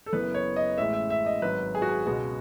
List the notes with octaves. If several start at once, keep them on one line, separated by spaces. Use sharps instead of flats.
A4
F#1 F#2 E3 B3 B4
C#5
D#5
A1 A2 G#3 E5
E5
E5
D#5
G#1 G#2 F#3 B4
G#4
F#4
G#4
C#2 B2 G#3 B3 F#4